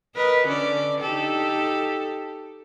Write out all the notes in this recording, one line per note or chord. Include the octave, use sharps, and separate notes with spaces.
A#4 B4 D#5
D3 C#4 D5
D#4 G4 A4